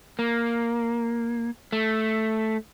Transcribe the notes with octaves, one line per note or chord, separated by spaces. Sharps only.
A#3
A3